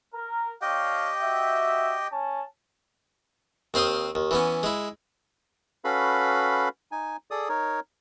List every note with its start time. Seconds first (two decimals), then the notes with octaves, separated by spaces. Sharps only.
0.14 A#4
0.62 D4 G4 C#5 D#5 F5 G5
1.21 F#4 E5
2.12 C#4 A5
3.74 D#2 C4 C5 F5 D#6
4.15 D#2
4.31 E3 B3 C#4
4.63 G#3 E4
5.84 C#4 F#4 A4 B4 F5 B5
6.92 D#4 G#5
7.31 G#4 A4 D5 D#6
7.49 D#4 A#4 C#5